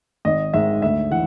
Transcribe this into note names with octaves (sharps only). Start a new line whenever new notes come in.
G#1 D#5
G#2 D#3 G#3 E5
D2 E5
E3 F#5